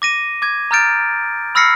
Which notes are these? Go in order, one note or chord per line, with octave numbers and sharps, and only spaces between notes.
D6 A#6 D#7
D6 G#6
A#5 D#6 F6 G6 A6 D7
B5 E6 F6 A#6 C7 C#7